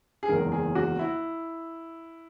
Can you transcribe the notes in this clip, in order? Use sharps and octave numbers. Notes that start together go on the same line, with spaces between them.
G#4
F#1 E2 D#3 G#3 A#4
G#4
F#4
E4